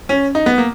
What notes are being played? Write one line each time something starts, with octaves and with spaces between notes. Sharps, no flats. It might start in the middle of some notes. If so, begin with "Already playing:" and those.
C#4
D#4
B3
A#3